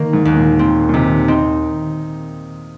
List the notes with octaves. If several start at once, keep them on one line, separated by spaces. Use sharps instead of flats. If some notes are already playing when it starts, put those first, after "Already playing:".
Already playing: D#3 A#3
G#2
D#2
A#2
A#2 C4
A#2
C3 D#3
C4 D#4